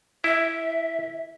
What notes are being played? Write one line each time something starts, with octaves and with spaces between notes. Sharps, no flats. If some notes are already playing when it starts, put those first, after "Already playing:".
E4 E5